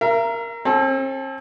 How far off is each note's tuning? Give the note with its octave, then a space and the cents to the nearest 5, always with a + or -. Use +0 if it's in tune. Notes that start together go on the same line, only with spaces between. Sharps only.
A#4 +0 E5 +45
C4 +45 A4 -15